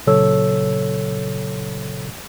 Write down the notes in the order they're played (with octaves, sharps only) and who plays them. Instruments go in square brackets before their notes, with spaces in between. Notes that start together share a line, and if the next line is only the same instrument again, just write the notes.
[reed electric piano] A#2 C#3 F#3 A4 C#5 E6